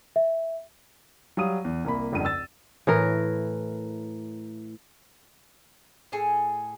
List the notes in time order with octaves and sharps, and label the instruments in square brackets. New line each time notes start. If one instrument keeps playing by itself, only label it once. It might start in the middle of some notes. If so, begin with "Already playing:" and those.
[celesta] E5
[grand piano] F#3 G3 F5 D#6 D#7
E2
C2 A#3 B5
F1 C#2 G2 D#7
E6 A6
[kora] A2 E3 A#4
[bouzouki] A2 G#4 A4 G#5